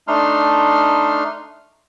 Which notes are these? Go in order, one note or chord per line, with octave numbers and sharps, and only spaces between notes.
A3 D4 D#4 C6 F6